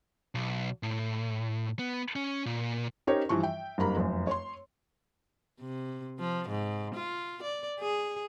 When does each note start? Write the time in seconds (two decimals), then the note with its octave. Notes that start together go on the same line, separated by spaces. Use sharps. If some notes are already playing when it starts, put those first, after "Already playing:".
0.35 B1
0.83 A2
1.79 B3
2.16 C#4
2.46 A#2
3.07 C#4 D#4 G4 A#4 C5 C#5
3.29 G2 E3 F3 C#6
3.43 E5 G5
3.78 F#1 G2 A#4 A#5 B5
3.97 F1 F#2
4.27 C#5 C6
5.60 C3
6.19 F3
6.49 G#2
6.94 F4
7.43 D5
7.80 G#4